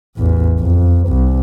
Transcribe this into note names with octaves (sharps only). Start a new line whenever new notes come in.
A1 E2
F2
C2